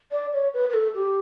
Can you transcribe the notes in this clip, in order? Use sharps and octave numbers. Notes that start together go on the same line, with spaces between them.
D5
C#5
B4
B4
A4
G4